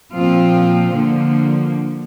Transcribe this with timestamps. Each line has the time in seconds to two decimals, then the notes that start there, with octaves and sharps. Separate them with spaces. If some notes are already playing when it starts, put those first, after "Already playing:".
0.13 A#2 F3 C4 F4
0.92 D3 F3 A#3